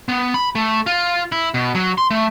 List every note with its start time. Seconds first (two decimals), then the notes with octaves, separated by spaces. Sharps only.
0.09 B3
0.34 B5
0.55 A3
0.86 F4
1.32 E4
1.54 B2
1.75 F#3
1.98 C6
2.11 A3